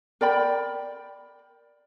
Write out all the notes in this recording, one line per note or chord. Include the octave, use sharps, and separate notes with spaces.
A#4 D5 G5 B5